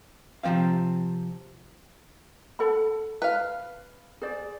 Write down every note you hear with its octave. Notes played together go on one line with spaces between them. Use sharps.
C3 E3 F3 C4 F5
A4 F#5 B5
B4 F5
G#4 C5 D5